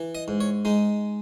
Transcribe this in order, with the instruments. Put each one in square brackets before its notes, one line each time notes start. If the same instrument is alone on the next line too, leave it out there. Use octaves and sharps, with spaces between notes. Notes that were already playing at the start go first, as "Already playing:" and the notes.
Already playing: [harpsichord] E3
D#5
G#2
C#5
G#3 D#4